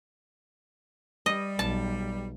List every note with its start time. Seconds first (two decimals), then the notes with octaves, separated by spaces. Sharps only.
1.26 G3 D#5
1.59 B1 A5